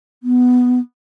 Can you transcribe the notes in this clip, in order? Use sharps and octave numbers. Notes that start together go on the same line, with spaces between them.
B3